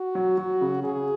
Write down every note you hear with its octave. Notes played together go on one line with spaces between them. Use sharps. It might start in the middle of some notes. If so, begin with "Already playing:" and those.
Already playing: F#4
F#3
F#3
C#3
C#3 G#4